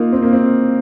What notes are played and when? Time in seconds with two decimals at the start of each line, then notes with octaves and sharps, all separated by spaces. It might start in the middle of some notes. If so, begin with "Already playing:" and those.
Already playing: A#3 D#4 F4
0.13 C4
0.23 A#3
0.33 C4